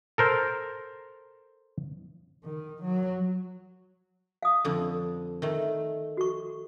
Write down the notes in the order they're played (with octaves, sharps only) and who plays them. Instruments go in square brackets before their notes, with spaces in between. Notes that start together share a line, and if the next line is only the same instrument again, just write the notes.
[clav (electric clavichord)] A4 A#4 C5
[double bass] D#3
F#3
[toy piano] F5 D#6
[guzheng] F2 D3
D#3 A3
[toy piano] F#4 C#6